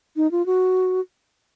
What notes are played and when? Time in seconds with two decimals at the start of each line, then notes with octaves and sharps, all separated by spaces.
0.16 D#4
0.31 F4
0.46 F#4